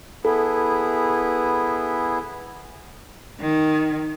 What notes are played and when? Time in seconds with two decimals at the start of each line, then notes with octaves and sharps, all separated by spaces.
0.25 B3 E4 G#4 A4
3.40 D#3